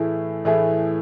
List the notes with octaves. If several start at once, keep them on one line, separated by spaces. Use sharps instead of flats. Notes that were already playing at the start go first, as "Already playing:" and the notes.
Already playing: A2 E3 A3 E4 G#4
A2 E3 A3 E4 G#4